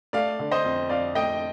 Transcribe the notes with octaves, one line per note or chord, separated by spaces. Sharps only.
A3 D5 F5
D3
C5 D#5
F2
F2 D5 F5
A3 D#5 G5